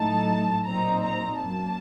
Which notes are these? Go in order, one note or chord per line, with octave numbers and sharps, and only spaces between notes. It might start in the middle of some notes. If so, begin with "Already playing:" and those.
Already playing: A2 F#3 A3 D#4 A5
A#2 F#3 C4 D#4 A#5
A#5
F#2 F#3 A#3 A5